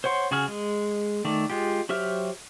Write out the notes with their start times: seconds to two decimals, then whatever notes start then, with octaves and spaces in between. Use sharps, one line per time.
0.04 C5 C#5 F#5 C6
0.31 C#3 F#4 G#4 G#5 F6
0.48 G#3
1.25 D#3 A3 D5
1.50 G#3 F4 G4
1.89 F#3 G4 C5 E5 F6